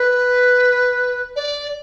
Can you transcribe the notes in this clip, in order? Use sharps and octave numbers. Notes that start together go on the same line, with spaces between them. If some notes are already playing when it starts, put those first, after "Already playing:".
Already playing: B4
D5